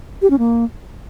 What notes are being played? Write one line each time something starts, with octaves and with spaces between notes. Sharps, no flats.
G4
C#4
A#3